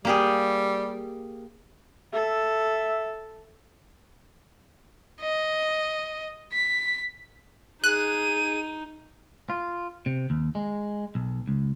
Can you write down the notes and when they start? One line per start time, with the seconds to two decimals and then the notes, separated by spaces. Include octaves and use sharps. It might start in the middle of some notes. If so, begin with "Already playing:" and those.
0.05 G3 A#3 G4 G#4
2.14 A4 E5
5.21 D#5
6.52 B6
7.84 D#4 G#4 F#6 D#7
9.50 F4
10.06 C3
10.30 D#2
10.55 G#3
11.15 B1
11.48 C#2